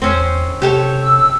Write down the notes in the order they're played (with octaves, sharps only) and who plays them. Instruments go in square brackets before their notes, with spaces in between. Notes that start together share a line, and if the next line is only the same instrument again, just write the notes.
[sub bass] E2 [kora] C4 C#4 C5
[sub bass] C3 [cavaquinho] G4 A4 C#5
[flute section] E6